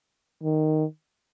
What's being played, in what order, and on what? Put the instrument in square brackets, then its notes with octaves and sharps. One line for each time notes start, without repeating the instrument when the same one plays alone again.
[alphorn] D#3